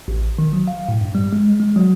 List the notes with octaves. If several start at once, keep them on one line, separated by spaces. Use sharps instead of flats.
A1
D#3
F#3
F5
A2
G2
G3
G#3
G#3
F#3